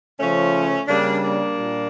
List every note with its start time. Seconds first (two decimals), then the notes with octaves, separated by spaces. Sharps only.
0.19 C#3 F3 A3 C#4
0.88 C#3 G3 A#3 D4
1.22 A#3 D4
1.56 A#2 G3